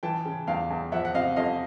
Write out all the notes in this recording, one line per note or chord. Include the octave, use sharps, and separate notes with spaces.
E3 G5 A5
C#3
E2 F5 G5
E2
F3 E5 F#5
F#5
C3 D#5 F5
F2 D#5 F5